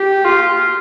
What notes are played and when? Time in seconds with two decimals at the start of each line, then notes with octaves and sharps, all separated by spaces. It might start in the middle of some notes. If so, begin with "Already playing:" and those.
Already playing: G4
0.24 F4